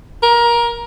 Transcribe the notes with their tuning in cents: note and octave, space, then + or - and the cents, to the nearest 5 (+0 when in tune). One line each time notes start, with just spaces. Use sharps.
A#4 +20